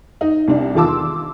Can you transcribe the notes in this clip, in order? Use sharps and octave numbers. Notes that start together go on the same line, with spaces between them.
D#4
C2 D4
E2 D#3 F4 A5 D6 E6
C6